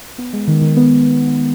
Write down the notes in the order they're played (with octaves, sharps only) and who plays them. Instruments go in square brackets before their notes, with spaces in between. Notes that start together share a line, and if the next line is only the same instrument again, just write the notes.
[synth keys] B3
G#3
D#3
D#3
B3